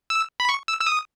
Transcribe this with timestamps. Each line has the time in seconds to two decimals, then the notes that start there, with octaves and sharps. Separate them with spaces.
0.10 E6
0.40 B5
0.49 C#6
0.68 E6
0.81 E6
0.87 D#6